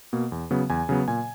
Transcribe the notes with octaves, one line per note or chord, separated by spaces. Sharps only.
B2 A#3
E2
C#3 F#3 B3
E2 G#5
C#3 F#3 B3
A#2 G#5